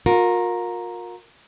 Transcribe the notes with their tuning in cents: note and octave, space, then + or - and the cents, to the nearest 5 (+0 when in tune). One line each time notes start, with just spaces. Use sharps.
F4 +45 A#4 +0